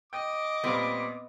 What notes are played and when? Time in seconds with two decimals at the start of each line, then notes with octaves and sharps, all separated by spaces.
0.13 D#5 G5 D6
0.64 A#2 G3 B3 C4